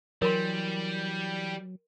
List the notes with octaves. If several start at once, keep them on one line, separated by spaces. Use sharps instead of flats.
E3 F#3 G3 A#4 C6